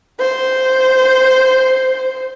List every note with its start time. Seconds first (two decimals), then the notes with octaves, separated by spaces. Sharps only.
0.20 C5